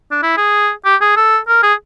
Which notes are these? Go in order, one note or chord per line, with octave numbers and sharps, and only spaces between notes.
D4
E4
G#4
G4
G#4
A4
A#4
G#4